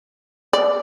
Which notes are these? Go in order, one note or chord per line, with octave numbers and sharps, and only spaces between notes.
D5